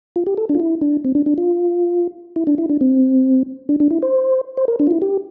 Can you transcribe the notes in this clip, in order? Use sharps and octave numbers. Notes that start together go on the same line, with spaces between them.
F4
G4
A4
D4
F4
E4
D4
C4
D4
D4
F4
E4
D4
E4
D4
C4
D4
D4
E4
C5
C5
A#4
D4
F4
E4
G4